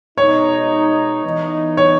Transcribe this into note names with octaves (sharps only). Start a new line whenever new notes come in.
B2 G#3 B3 D#4 C#5
E3 B3 D#4
C#5